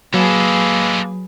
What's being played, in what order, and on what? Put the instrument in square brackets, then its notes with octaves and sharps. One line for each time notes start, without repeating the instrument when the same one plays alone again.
[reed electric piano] F#3 [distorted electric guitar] G#3 A4 [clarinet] A#3 [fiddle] G#4 B4